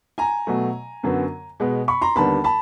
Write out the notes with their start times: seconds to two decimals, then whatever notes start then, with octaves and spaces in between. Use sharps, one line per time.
0.18 G#5 A#5
0.47 B2 F#3 A3
1.03 F#2 D3 F#3 B3
1.60 B2 G#3 B3
1.88 B5 C#6
2.02 A#5 C6
2.16 D#2 D3 G3 B3 A5 B5
2.44 A5 B5